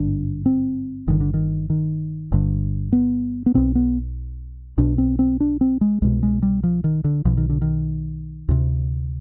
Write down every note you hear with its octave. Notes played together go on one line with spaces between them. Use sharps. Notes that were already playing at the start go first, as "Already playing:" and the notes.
Already playing: G#1 G2 D3 D4
C4
G1 G2 D3 D#3
D3
D#3
D#3
G1 G2 D3
B3
B3
B1 B2 C4
B3
B1 B2 D4
C4
C4
D4
C4
G#3
C2 B2 G#3
G#3
G3
F3
D#3
D3
B1 B2 F3
D#3
D3
D#3
D2 C3